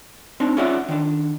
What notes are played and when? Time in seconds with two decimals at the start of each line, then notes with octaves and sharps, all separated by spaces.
0.40 C4 D4 D#4
0.57 C#4 F4 G#4 D5 E5 F#5
0.89 D#3 D4